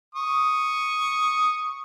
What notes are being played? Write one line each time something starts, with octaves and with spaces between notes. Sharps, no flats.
C#6 D#6